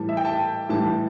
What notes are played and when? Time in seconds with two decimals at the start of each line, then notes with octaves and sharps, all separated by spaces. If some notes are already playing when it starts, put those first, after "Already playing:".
Already playing: A2 E3 G3 A5
0.09 E5
0.17 G5
0.25 A5
0.69 A2 E3 G3 A5